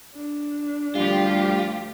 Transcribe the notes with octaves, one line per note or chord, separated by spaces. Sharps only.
D4
D2 F3 G3 F4 G4